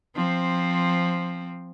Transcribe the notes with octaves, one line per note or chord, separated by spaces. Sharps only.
F3 C4